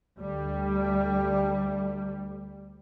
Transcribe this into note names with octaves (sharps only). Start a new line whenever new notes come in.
D2 G3